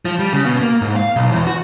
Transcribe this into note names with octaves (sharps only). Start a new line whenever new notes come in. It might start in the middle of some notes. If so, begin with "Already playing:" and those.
F3
G3
C#3
B2
A#3
G#2
F5
B1
E2
F#4